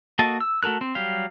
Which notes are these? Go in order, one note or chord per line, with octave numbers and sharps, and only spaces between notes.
A#3 F#4 A4 D#5 A5
E6
A3 F#4 A4 A#4 F#6
C4
F#3 G3 G4 F5